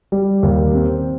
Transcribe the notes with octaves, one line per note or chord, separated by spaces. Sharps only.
G3
D#2
C4